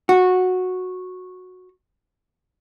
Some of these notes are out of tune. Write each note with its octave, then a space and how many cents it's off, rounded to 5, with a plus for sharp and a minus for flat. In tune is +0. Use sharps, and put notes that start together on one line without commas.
F#4 -10